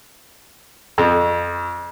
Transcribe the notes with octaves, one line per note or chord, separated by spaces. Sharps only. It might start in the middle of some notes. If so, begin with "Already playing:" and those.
F2